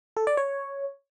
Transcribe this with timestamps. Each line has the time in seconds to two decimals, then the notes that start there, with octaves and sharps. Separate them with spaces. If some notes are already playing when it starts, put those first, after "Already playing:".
0.17 A4
0.27 D5
0.37 C#5